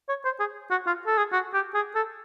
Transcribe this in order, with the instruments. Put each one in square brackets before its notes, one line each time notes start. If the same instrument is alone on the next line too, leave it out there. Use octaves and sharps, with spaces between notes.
[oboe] C#5
C5
G#4
F#4
F4
A4
G#4
F#4
G4
G#4
A4